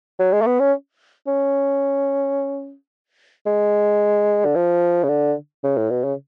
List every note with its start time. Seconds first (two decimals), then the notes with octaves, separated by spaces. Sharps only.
0.19 F#3
0.32 G#3
0.42 A3
0.46 B3
0.60 C#4
1.27 C#4
3.46 G#3
4.45 D3
4.55 F3
5.03 C#3
5.08 D3
5.64 C#3
5.77 A2
5.90 B2
6.04 C#3